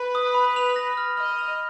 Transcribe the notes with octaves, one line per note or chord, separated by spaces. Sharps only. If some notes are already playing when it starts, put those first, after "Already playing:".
Already playing: B4
D#6
B5
F7
A#6
F6
D#5 F6
F7